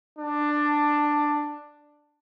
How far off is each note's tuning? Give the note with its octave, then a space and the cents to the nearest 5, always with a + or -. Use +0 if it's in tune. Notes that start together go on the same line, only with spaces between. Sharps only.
D4 +10